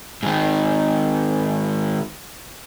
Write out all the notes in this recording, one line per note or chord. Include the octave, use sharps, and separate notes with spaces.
G#2 D#3